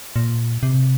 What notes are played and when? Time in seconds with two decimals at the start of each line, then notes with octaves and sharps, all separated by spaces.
0.16 A#2
0.63 C3